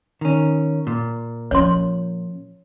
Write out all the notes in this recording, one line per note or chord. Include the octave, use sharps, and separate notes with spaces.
D#3 C#4
A#2
F3 C#4 C#5 C6